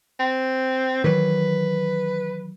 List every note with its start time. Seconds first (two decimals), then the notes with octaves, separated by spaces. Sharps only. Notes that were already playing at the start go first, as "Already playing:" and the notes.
0.20 C4
1.04 D#3 E3 F#3 B4